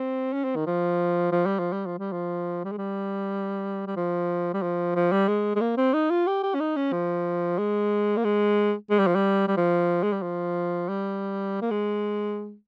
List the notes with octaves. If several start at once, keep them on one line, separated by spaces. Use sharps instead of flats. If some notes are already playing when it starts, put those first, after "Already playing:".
Already playing: C4
C#4
C4
D#3
F3
F3
G3
F3
G3
F3
G3
F3
G3
G#3
G3
G3
F3
G3
F3
F3
G3
G#3
G#3
A#3
C4
D#4
F4
G4
G4
C#4
D#4
C#4
F3
G#3
A#3
G#3
G#3
G3
F3
G3
G3
F3
G#3
G3
F3
G3
A#3
G#3